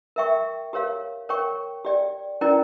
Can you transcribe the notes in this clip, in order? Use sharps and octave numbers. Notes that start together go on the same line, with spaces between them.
A#4 E5 G5 C#6
G4 A#4 C#5 F5
A#4 C#5 G5 C#6
G4 D5 G5
C#4 E4 A#4 D5 G5